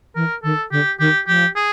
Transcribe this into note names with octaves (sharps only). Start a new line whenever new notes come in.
E3 A#4
D#3 A4
D3 G4
D#3 G4
F3 G4
G#4